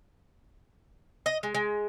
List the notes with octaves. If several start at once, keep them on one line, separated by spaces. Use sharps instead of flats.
D#5
G#3
G#3